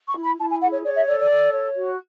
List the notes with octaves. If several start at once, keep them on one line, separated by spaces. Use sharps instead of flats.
C#6
E4
B5
E4 A5
G#5
G#4 F#5
C#5
C#5 D5
E5
A4 D5
D5
A4
C#5
F#4